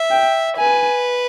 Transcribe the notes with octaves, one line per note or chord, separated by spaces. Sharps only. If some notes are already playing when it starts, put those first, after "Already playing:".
Already playing: E5
G5
B4 G#5